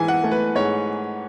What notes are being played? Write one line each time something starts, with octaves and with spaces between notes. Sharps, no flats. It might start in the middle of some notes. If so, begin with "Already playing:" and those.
Already playing: G#2 E3 G#5
F#5
A3
B4
G#2 C#5